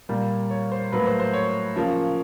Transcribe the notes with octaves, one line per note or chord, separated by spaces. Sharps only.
A#2 G3 A#3
C#5
C5
A2 F#3 A#3 B4
C5
C5
C#5
C#3 F3 A#3